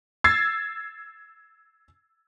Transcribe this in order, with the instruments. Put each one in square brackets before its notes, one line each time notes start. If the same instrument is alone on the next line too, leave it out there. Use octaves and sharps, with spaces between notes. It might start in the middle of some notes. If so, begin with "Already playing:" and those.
[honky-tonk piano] E6 G#6 A6 C7